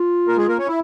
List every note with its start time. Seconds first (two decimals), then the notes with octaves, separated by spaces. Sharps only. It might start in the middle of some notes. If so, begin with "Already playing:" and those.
Already playing: F4
0.28 A#3 A#4
0.37 G#3 G#4
0.48 A#3 A#4
0.58 C#4 C#5
0.68 E4